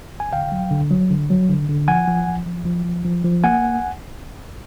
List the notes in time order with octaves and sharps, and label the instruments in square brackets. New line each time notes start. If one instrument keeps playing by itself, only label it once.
[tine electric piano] G#5
D3 F5 G5
F#3
D3
F#3
D3
F#3
D3
D3
F3 F#5 G#5
F3
F3
F3
F3
F3
F3
F3
A#3 F#5 G#5